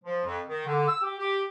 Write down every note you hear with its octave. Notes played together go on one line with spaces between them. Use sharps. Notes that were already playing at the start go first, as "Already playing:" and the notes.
F3
F2
D#3
D3
E6
G4
G4